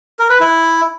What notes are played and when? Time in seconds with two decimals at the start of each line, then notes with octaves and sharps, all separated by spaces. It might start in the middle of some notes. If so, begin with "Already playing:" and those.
0.19 A#4
0.30 B4
0.40 E4